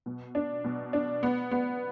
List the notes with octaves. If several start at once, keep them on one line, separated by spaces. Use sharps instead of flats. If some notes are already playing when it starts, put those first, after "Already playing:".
B2
D4
B2
D4
B3
B3